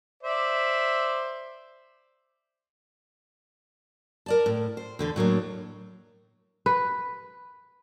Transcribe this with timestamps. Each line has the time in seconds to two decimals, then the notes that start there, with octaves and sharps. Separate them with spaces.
0.23 C5 D5 E5
4.26 A#4 D5 A5
4.46 A2
4.77 C5
4.99 E2 D3 A4
5.16 A2 F#3 A#3 D4
6.66 B4